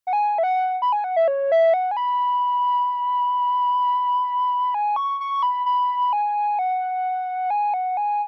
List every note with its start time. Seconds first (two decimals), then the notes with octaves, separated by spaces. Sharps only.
0.07 F#5
0.13 G#5
0.38 E5
0.43 F#5
0.82 B5
0.92 G#5
1.04 F#5
1.16 E5
1.28 C#5
1.52 E5
1.74 F#5
1.91 G#5
1.97 B5
4.74 G#5
4.96 C#6
5.21 C#6
5.43 B5
5.66 B5
6.13 G#5
6.59 F#5
7.50 G#5
7.74 F#5
7.97 G#5